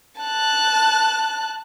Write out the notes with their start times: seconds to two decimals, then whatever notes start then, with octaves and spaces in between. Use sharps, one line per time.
0.21 A5 F#6